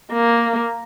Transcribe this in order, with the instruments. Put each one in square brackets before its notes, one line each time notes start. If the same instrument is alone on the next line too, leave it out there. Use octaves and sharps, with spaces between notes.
[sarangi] A#3